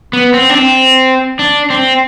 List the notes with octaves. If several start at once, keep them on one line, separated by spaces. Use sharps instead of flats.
B3
C4
D4
C4
D4
C4